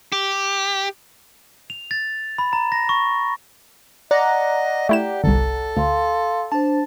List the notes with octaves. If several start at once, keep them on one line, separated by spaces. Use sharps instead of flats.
G4
F7
A6
B5
A#5
A#6
C#6
D5 D#5 F#5 A#5
A3 E4 G4 E7
G1 C2 A4
D2 F5 C6
D4 C5 A5